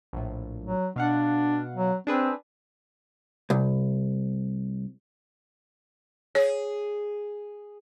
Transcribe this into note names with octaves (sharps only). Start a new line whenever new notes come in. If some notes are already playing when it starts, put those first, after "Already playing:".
A#1 A2
F#3
B2 D4 F5 F#5
F#3
C4 D4 G#4 B4
C2
G#4 C#5